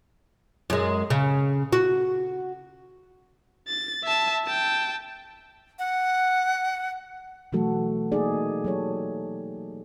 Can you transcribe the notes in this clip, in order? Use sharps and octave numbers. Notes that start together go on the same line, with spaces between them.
F#2 G#3
C#3
F#4
A6
E5 A5
G5 A5
F#5
B2 E3 F#3 A3 F#4 A4
A#3 D#4 G#4 D5
F#3 G4 A4 C#5